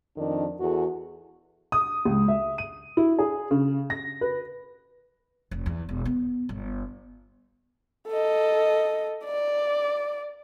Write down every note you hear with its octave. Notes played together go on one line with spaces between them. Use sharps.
F2 D#3 D4
E2 F#4 G#4 A4
D#6
C#2
E5
D#7
E4
G#4
C#3
A#6
B4
F1
E2
E1
B3
G1
A4 D#5
D5